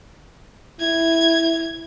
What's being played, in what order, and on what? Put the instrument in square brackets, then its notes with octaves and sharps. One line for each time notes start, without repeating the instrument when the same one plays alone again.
[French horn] E4 [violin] G#6